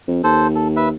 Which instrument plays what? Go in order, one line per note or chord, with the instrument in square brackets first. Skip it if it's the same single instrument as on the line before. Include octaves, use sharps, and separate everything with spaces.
[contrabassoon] F2
[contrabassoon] D#2 [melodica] A4 C5
[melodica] A4
B4 E5